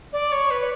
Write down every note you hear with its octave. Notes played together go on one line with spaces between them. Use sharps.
D5
C#5
B4